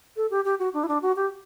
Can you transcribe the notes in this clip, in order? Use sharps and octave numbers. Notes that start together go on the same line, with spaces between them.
A4
G4
G4
F#4
D4
E4
D4
F#4
G4